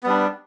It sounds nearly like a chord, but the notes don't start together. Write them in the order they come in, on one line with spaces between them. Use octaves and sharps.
B3 G3 D4